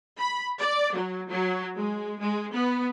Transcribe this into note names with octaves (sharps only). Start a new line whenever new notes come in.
B5
D5
F#3
F#3
G#3
G#3
B3